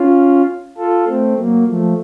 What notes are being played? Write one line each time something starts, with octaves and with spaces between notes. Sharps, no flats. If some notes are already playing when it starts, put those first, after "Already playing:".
Already playing: C#4 F4
F4 A4
A3 C4
F#3 A#3
F3 A3